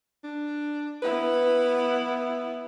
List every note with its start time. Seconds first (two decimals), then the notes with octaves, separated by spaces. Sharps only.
0.24 D4
1.02 B3 E4 B4